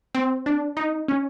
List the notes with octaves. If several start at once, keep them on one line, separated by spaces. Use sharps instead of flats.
C4
D4
D#4
C#4